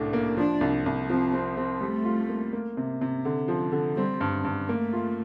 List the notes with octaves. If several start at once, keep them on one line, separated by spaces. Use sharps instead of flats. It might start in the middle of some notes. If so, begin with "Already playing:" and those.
Already playing: C2 A2 D4
A#3
F3 D4
C2
C2
F3 C4
C4
C4
G3 A3
F4
A#3
A#3
C3
C3
D3
F3
D3
G3 C4
G2
G2
A3 A#3
F4